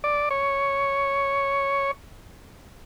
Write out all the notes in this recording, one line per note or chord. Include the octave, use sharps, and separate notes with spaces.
D5
C#5